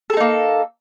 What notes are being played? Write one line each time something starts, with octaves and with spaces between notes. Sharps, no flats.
A#3 D#4 G#4 A4